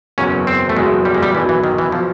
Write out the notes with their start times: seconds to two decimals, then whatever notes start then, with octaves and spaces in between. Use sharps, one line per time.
0.18 F#1 E2 B2 F#3 C#4
0.47 C4
0.69 A3
0.76 F#1 E2 B2 F#3 G#3
1.05 G3
1.14 G#3
1.23 G3
1.34 B1 B2 E3 F#3
1.49 E3
1.64 D#3
1.78 E3
1.92 B2 F3 F#3